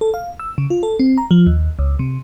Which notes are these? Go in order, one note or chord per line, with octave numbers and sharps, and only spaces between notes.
A4
F5
E6
C#3
F4
A4
C4
A#5
F3
D#2
C#2
C3